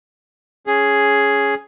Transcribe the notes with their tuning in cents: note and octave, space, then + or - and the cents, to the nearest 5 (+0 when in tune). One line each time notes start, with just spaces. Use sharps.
C#4 +0 G#4 +5